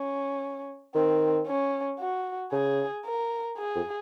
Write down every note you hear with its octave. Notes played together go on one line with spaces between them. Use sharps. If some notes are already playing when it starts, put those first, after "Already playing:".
Already playing: C#4
D#3 C4
C#4
F#4
C#3 G#4
A#4
G#4
F2